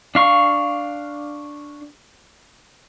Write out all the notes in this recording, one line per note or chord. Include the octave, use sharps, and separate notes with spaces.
D4 F5 C#6